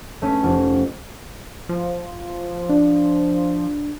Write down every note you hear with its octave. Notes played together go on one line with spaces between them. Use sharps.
A3 C#4
F1 F4
F3
D4